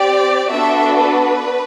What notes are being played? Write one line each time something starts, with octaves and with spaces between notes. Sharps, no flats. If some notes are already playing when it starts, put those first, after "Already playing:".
Already playing: C4 G4 D5
B3 D4 F#4 A4 E5
B4